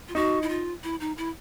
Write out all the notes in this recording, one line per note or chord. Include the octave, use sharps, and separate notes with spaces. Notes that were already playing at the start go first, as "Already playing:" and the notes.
F4
D#4 F#4
E4
F4
E4
D#4
E4